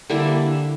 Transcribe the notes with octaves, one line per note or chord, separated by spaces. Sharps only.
D3 G3 A#3 D4 E4 E5